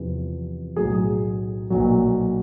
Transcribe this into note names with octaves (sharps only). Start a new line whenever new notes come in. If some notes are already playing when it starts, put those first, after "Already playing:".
Already playing: E2 C3 F3
B1 A2 F#3 G#4
B1 A#2 F#3